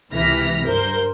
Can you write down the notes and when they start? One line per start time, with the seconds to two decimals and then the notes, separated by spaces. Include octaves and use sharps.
0.12 C#2 C3 E3 F6 A#6 B6
0.67 G2 A#4 C5 G6